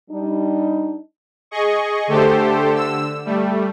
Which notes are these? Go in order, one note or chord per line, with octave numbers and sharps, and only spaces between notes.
G3 D4 D#4
G#4 D#5 C#6
D3 A3 G4 A4 C5
D3 E6
G3 A3